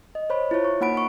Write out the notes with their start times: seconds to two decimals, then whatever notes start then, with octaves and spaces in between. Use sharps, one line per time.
0.15 D#5
0.30 C5 C#5 B5
0.51 E4 F4 C#5
0.65 C#6
0.81 A#3 D#4 F#5 B5 D7
0.94 F#5 C#6